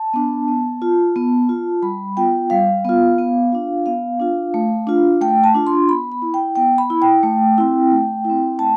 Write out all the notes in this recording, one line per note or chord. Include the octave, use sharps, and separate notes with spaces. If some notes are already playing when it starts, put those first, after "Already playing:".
Already playing: A5
B3 D4
B3
F4
B3
F4
G3 B5
B3 F4 G5
G3 F5
B3 F4
B3
D4 F4
B3 F5
D4 F4
A3
D4 F4
A3 G5
A5
D4 F4
C6
B3 B5
B5
E4
G5
B3 G5
B5
E4
G5
A3
C4 E4
A3
E4
C4
A3 A5